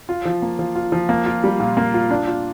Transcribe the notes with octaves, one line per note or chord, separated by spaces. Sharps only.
F4
F3
A#3
F3
F4
F3
A#3
F4
G3
A#2
A#3
F4
D4
F4